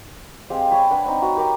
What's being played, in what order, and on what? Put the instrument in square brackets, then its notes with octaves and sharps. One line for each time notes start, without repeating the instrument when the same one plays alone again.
[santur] G#3 C4 G4 F5
C#5 G5 G#5 B5
D4 B4 F#5
C4 D#4
F#4 B4 A#5
G4 A#4 D6